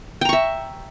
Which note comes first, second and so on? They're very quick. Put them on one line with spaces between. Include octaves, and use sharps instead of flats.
G5 A#5 C#6 E5